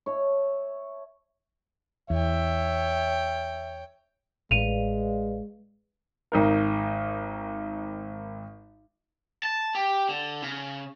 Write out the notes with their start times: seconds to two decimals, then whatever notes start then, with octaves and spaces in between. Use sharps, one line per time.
0.06 C#5 E5 A5
2.10 E2 C#5 E5 G5
4.51 A1 G#3 B4 D5 F5 D#7 F7
6.32 G#1 D#4 A#4
9.43 A5
9.75 G4
10.09 D3
10.42 C#3